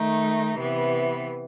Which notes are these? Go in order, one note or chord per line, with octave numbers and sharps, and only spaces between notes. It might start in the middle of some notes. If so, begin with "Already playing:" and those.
Already playing: D#3 A3 D#4
C3 E3 B3